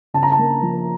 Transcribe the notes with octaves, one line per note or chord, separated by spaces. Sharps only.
C#3 A5
A#5
A5
A#3
F3